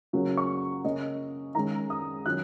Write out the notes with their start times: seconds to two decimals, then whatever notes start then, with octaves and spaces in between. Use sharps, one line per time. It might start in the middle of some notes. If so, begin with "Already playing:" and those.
0.13 C#3 F#3 A#3 C#4
0.37 C#6
0.84 C#3 A#3 C#4 D#5
1.55 D#3 G#3 C#4 A#5
1.90 D#6
2.26 D#3 F#3 C#4 F#6